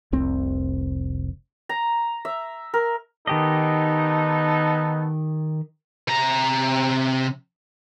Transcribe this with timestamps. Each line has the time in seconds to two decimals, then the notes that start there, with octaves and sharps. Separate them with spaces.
0.12 F1 C2 C4
1.69 A#5
2.25 E5
2.74 A#4
3.27 D#3 B3 D#4 G4 A4 D#5
6.08 C3 A#5